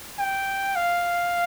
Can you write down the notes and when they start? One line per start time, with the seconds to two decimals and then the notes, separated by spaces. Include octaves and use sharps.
0.19 G5
0.75 F5